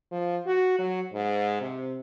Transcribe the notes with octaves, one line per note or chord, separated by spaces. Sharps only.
F3
F#4
F#3
G#2
C3